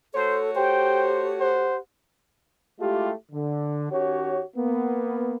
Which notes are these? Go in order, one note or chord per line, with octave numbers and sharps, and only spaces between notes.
A3 F#4 A4 C5 C#5
G4 C5 G5
C5 F#5
G#3 A3 E4 F4 G4
D3
D#3 C#4 F#4 G4 C#5
A#3 B3